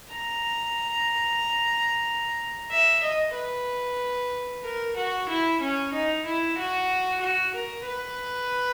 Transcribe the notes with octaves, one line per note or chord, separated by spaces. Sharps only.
A#5
E5
D#5
B4
A#4
F#4
E4
C#4
D#4
E4
F#4
F#4
A#4
B4